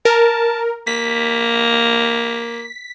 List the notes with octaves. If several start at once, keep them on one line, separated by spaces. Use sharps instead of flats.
A#4 A5
A#3 B6